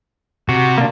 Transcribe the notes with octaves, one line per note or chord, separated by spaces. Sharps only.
C3 F#4
A#3 D4